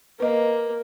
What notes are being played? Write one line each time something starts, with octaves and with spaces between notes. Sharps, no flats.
A#3 B4 D#5